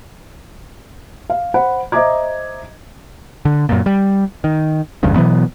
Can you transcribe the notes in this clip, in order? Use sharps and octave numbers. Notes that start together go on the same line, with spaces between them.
F5
C5 F#5 B5
C5 D#5 E5 A#5 D6 G#6
D3
F#2 A#2
G3
D#3
G#1 E2 G2 C#3
B2 E3 F#3 B3